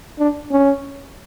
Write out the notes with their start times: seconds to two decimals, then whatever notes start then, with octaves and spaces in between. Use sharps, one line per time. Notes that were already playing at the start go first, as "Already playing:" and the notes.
0.19 D4
0.51 C#4